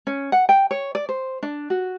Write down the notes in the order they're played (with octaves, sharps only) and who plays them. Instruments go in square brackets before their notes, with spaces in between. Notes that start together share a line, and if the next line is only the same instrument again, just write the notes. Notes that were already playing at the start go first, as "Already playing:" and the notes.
[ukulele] C#4
F#5
G5
C#5
D5
C5
D4
F#4